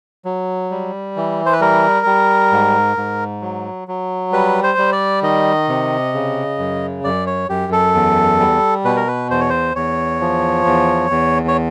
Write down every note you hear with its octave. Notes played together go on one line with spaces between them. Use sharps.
F#3
G3
E3
C5
B4
G3 A#4
G3
G#2
G#2
F#3
F#3
G3 B4
C5
G3
D5
D#3 D#5
C3
C#3
F#2
F#2 D5
C#5
F#2 G4
A4
E2
G3
B2 B4
A#4
B4
E2 C5
C#5
C5
E2 C#5
F3
E2
E2
C#5